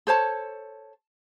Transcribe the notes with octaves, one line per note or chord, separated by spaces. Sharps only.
A4 C5 C#5 A5